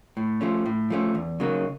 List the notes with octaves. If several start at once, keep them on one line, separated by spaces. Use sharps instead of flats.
A2
F3 A3 C#4
A2
F3 A3 C#4
E2
C#3 F#3 A#3 D#4